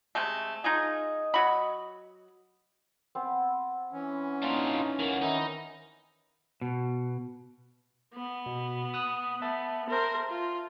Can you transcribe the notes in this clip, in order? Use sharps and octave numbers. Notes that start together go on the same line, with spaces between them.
C3 G#3 A3
D#4 F4 G#4 D#5
F#3 F#4 B5
B3 C4
E3 C#4
D4 D#4 F4
D#3 A#3 F#5
D#3 C4 D#4 E4 A#4
B2
B3
B2
D#6 F#6
B3 E5 A5
A#4 C5
F4